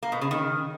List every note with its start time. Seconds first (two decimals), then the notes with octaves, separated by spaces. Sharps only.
0.03 A#3
0.12 B2
0.21 C#3
0.31 D#3